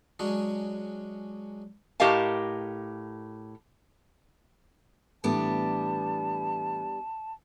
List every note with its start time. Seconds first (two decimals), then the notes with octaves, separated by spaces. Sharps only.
0.19 F#3 G#3 C#4 D4
2.00 A2 G4 A#4 D#5 F5 A5
5.24 A2 E3 G3 B3 D4 A5